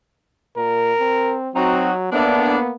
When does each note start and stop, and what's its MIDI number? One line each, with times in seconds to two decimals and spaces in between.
0.57 0.93 46
0.57 1.37 70
1.00 1.50 60
1.55 2.09 54
1.55 1.91 60
1.55 1.93 63
1.55 1.93 66
2.12 2.56 45
2.12 2.74 58
2.12 2.75 59
2.12 2.56 62